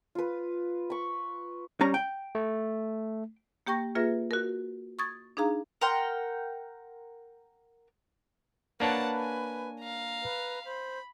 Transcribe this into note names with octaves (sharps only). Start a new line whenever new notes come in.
F4 B4
B5 C#6
G3 C#4 A#5
G5
A3
A#3 G4 G5 C#6 A#6
A#3 F4 G#4 B4 E5 A#6
F#4 A#4
C#6 D#6 G#6 A6
D4 D#4 G#4 F5 A#5
A#4 F#5 G5 C6
A#3 D4 B4 C#5 F#5 A5
G#5
F5 A#5
B4
C5 B5